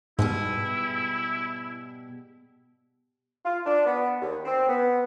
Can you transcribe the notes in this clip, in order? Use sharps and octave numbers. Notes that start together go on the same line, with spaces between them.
G#2 B2 G3 E4 G#4
F4
D4
B3
D#2
C4
B3